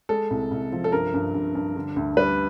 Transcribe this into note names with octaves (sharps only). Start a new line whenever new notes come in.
G#3 A4
C2
C2
F3
A4
G2 A#4
G2
G2
G2
D3
D2
G3 B4